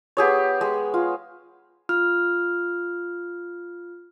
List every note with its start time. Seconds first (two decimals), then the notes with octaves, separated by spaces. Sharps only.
0.17 B3 G4 G#4 C#5
0.61 G#3
0.94 F4
1.89 F4 F6